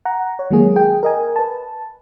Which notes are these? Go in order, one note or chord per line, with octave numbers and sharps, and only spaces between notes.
F#5 A#5
C#5
D#3 F#3 G#3 A#3 G#4
G#4 G5
A#4 D#5 G#5
B4 A5